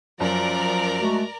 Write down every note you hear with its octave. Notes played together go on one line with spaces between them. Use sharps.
F#2 F3 A#4 D5 A#5
G#3 A3 F#4